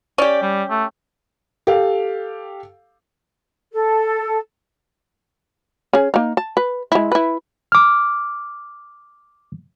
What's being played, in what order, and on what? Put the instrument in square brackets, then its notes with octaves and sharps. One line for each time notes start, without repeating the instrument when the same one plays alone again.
[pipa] C#4 G4 [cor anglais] D5
[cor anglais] G3
A3
[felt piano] G4 A4 F5
[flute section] A4
[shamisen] C#4 G#4
A#3 D#4
A5
B4
G#3 E4
E4 B4
[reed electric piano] D6 F6